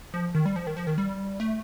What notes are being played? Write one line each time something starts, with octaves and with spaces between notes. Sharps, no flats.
F3
D#3
G3
F3
D#3
F3
D#3
G3
A3